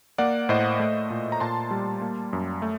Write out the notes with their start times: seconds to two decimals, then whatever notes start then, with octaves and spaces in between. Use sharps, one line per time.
0.18 A#3 D5 F#5
0.49 A2 C5 D#5
0.80 A3
1.10 A#2
1.32 A#5
1.40 A#2 A5 C6
1.71 G3
2.02 A#3
2.33 F#2
2.62 A3